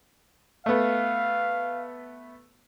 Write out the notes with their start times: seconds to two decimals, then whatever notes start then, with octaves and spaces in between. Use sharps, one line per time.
0.66 A3 B3 F5